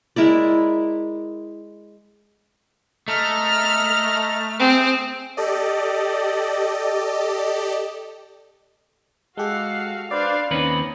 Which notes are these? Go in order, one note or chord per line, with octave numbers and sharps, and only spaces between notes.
G#3 E4 A#4 D5
A3 A4 D#5 A#5 F6
C4 G#4
G4 A4 D5 D#5
G#3 F#4 G4 A4 F5 F#5
D4 B4 C5 D5 F5
D#2 C4 C#4 D#4 B4